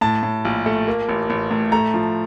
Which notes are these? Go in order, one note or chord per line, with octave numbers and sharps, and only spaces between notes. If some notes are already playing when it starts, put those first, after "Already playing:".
A2 A5
A2
A#1
A3
A#3
A1
A1
A2
A3 A#5
F3